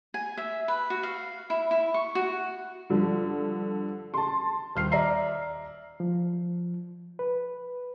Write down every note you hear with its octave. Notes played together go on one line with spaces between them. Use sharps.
G#5
E5
B4
F#4
F5
E4
E4
C#6
F#4
G2 D3 F3
A5 C6
D#1 F6 C7
D5 E5 A#5 C7
F3
B4